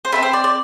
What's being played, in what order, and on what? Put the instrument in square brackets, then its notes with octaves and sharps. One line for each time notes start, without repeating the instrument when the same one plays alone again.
[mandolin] C5
C4 E4 A4 B4
C5
D5
D5